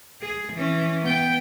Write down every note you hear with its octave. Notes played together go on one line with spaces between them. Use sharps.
G#4
E3 C#4
B3 G5